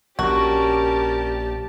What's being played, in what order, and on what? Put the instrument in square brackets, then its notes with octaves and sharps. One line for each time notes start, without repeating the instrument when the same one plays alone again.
[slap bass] A#1 A#2 [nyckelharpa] C#4 A#4 [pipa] F#4 [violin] G4 A5